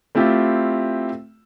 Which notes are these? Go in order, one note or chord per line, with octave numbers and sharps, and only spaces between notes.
A3 C4 E4 F4 G4